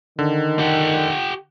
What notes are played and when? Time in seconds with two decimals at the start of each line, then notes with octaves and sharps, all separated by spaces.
0.19 D3 D#3
0.59 G4 F#5